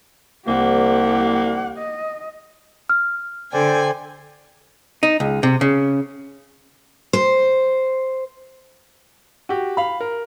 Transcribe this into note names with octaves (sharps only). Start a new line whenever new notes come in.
C2 A#3 G4 F#5
D#5
F6
D3 A4 C5 D5 G5 G#5
D#4
C#2
C3
C#3
C5
F#4 G4
F5 B5
A#4